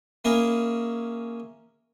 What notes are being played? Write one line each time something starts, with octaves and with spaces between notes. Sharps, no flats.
A#3 C#4 E4 G#4 A#4